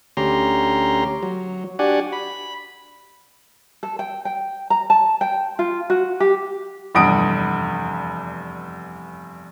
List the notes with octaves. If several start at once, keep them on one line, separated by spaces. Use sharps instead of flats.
D2 C#4 G4 A#5 C6
F#3
D4 F#4 G4 D5 F#5 G#5
B5
A4
G5
G5
A#5
A5
G5
F4
F#4
G4
F1 E2 G2 D#6 D7